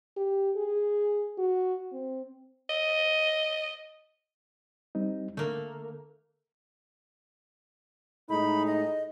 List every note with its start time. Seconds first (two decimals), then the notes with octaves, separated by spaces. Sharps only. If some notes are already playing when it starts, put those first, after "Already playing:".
0.17 G4
0.57 G#4
1.38 F#4
1.93 C4
2.70 D#5
4.95 G3 C4 D#4
5.37 D3 A3 A#3
8.29 A2 G#3 D#4 B5
8.67 D#5